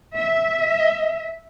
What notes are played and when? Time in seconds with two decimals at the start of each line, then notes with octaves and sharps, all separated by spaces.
0.15 E5